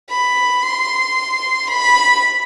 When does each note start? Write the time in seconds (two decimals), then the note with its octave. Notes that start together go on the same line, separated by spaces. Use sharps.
0.10 B5
0.62 C6
1.68 B5